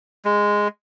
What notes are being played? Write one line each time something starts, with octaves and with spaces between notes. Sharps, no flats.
G#3